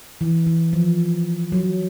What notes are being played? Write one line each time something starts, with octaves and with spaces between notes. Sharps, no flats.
E3
E3
F3
F#3